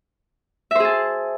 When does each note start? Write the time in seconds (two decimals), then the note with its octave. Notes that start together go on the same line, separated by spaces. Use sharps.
0.71 E5
0.75 C5
0.80 G#4
0.85 A5